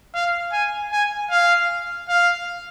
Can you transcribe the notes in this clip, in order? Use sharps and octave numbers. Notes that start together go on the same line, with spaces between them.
F5
G#5
G#5
F5
F5